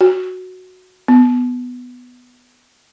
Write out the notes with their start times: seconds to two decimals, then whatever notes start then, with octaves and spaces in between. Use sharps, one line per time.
0.01 F#4
1.08 B3